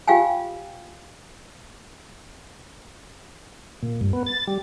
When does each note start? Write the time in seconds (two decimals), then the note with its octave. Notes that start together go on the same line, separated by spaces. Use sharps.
0.08 F4 G4 F5 G5 G#5
3.83 A#2
4.01 G2
4.13 B3
4.26 A6
4.47 G3